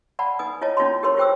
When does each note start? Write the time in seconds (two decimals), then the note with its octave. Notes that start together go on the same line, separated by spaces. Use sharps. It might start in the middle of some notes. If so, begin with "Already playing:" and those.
0.19 D5 F#5 A5 B5
0.39 D#4 B4 G#5 D#6
0.61 E4 F4 C#5 D#5 A5
0.77 C#4 D#4 F4 F#4 A5 C6
1.02 E4 G4 A#4 B4 C#5 C6
1.17 F4 G4 C5 G5 D6 E6